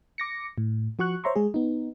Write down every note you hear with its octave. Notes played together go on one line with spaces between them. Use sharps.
D6 A#6 C#7
A2
F3 F#4 C#6 F#6
C5 C#5 E5 A#5 C6 C#6
G#3 G#4
B3 D#4